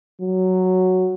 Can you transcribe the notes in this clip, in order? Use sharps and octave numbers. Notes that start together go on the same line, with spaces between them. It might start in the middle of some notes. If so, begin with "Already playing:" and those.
F#3